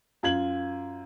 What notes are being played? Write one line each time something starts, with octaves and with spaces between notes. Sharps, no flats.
F#2 F4 G#6 F#7